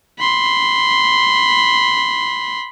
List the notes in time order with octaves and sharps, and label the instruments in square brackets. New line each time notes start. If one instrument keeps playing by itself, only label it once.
[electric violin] B5 C6